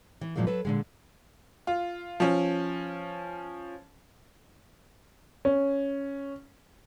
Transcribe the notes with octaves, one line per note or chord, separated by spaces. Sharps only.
E3
F#2 A#2 F3 F#3 G#3 A#3
F#3 A4 B4
A#2 D3 G#3
F4
F3 C#4
C#4